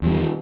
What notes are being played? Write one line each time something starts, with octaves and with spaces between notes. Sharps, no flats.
E2 D#3 G3